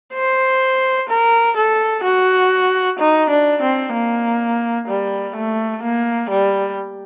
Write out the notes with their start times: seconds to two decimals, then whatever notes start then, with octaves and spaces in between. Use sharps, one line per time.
0.14 C5
1.09 A#4
1.57 A4
2.04 F#4
2.99 D#4
3.30 D4
3.62 C4
3.93 A#3
4.88 G3
5.36 A3
5.82 A#3
6.30 G3